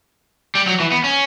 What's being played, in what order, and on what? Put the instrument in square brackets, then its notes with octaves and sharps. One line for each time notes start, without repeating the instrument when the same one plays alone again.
[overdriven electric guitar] G3
F#3
E3
B3
C#4